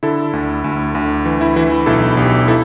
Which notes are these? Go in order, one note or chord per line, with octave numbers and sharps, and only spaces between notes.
D3 E4 A4
D2
D2
D2
E3
E4
E3 E4
E4
B1 E4 A4
B1 G4
E4 A4